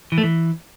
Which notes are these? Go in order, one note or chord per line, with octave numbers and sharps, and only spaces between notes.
E3
A3
E3